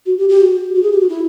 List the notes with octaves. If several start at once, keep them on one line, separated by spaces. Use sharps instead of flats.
F#4
G4
G4
F#4
F#4
G#4
G4
F#4
E4